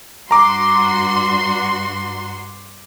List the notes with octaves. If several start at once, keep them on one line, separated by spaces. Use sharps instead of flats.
G2 F#4 A#5 C6 D6